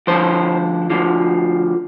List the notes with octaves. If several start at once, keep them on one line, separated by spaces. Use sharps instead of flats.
D2 D3 F3 C5
D2 D3 F3